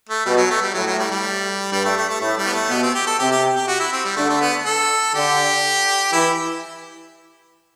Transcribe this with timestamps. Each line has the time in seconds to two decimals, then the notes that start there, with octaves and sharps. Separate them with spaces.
0.09 A3
0.26 B2 G3
0.37 F#3
0.50 A3
0.62 G3
0.74 A2 F#3
0.87 F#3
0.99 G3
1.11 G3
1.72 G2 G3
1.85 A3
1.97 A3
2.09 A3
2.21 A2 A3
2.38 G3
2.46 B3
2.54 A3
2.69 B2 B3
2.83 C4
2.94 G4
3.07 A4
3.19 C3 G4
3.31 G4
3.55 G4
3.67 F#4
3.79 E4
3.93 C4
4.05 G3
4.16 D3 A3
4.29 A3
4.41 B3
4.66 A4
5.14 D3 G4
6.13 E3 E4